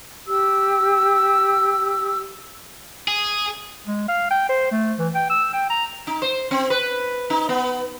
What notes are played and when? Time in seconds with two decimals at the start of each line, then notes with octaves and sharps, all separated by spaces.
0.26 G4 E6
3.08 G#4
3.87 G#3
4.08 F5
4.31 G5
4.49 C5
4.71 A3
4.99 E3
5.15 G5
5.30 E6
5.53 G5
5.70 A#5
6.07 D#4
6.22 C5
6.51 C4
6.70 B4
7.30 D#4
7.49 B3